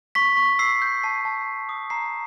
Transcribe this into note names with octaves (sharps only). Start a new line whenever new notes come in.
C#6 B6
C#6
E6 C7
G6
A5 C7
A5
C6
D#6
A#5 C7